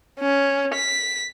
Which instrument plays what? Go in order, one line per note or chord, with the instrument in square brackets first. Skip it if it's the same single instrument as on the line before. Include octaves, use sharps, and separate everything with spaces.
[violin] C#4
B6